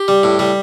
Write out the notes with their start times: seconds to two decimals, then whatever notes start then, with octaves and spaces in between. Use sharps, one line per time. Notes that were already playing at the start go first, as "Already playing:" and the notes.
Already playing: G4
0.08 G3
0.23 A2
0.39 G3